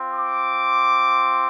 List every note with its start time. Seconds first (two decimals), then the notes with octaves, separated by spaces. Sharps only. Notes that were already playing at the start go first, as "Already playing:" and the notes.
Already playing: C4 F4
0.13 D6